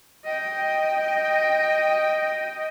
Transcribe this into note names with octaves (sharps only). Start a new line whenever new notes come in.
D#5 G5